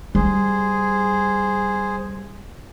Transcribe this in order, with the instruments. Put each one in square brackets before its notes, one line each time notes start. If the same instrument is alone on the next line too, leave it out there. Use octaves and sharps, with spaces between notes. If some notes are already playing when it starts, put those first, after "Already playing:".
[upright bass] G3 [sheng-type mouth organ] G#4 C5